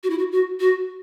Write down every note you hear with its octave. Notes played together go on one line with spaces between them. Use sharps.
F#4
E4
F#4
F#4
F#4